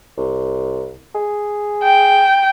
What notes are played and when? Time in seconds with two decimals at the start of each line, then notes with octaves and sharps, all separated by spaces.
0.18 C2
1.15 G#4
1.83 G5